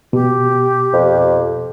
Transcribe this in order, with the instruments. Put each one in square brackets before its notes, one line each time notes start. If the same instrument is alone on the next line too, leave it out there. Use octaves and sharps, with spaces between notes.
[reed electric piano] B2 [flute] G4
[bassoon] F2